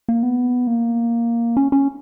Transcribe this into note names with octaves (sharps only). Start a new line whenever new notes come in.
A#3
B3
A#3
C#4
C#4